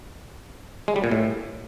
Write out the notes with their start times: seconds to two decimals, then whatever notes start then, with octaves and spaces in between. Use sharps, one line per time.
0.88 G#3
0.96 G3
1.04 A#2
1.11 A2